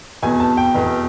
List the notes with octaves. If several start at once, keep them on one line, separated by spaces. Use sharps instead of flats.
F1 E2 B2 G#5
A5
G5
F1 E2 B2